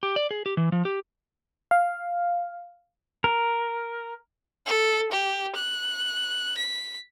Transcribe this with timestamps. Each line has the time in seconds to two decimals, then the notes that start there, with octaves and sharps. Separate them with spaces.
0.03 G4
0.16 D5
0.31 G#4
0.46 G4
0.57 E3
0.72 F3
0.85 G4
1.71 F5
3.24 A#4
4.66 A4
5.12 G4
5.56 F#6
6.58 B6